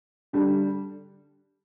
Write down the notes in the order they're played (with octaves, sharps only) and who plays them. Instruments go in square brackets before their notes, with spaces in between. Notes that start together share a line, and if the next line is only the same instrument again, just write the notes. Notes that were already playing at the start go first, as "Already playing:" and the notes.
[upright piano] D3 G3 D4